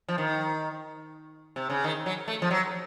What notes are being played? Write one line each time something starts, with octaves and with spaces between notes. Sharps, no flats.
F3
D#3
C3
C#3
D#3
F#3
A3
F3
F#3